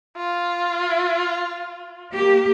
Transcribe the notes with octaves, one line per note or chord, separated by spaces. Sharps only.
F4
A#3 G4